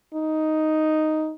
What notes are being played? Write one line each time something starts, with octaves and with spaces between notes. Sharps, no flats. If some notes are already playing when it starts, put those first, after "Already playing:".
D#4